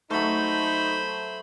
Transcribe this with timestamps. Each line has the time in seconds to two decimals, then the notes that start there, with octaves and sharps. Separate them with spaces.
0.11 F#3 A3 D#4 C5 B5